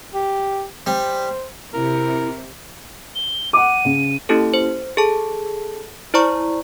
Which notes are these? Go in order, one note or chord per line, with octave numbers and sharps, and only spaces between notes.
G4
G3 C5
C3 E4 A#4
G7
F#5 D6 D#7
C#3
A#3 C#4 E4 G4 A4
C5
G#4 A4 A5
E4 C5 D5 A#5 C#6